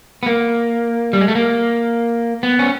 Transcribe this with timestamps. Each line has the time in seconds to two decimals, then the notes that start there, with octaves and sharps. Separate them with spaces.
0.23 B3
0.26 A#3
1.13 G3
1.21 G#3
1.28 A3
1.35 A#3
2.43 B3
2.59 C#4